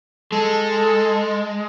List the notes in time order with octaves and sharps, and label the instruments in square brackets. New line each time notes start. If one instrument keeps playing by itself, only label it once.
[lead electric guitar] G#3 [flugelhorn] A4